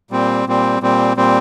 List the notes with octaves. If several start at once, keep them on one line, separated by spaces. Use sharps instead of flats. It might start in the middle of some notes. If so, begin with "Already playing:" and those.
A#2 G3 C4
A#2 G3 C4
A#2 G3 C4
A#2 G3 C4